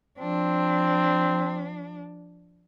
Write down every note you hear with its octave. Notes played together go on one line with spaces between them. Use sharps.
F3 C4 D4